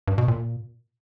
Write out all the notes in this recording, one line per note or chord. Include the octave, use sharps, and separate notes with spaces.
G2
B2
A#2